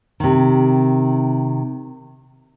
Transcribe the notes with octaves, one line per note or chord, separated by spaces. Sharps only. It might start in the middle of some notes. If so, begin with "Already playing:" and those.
C3 D#3